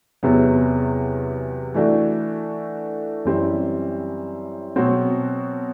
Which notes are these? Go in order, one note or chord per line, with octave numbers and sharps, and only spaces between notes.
E2 C3 F#3 B3
E3 A3 D4 F#4
F#2 E3 G3 C4 G4
B2 F#3 C4 F#4